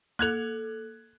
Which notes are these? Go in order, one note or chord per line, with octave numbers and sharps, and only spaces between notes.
A#3 A4 F#6 G#6 F7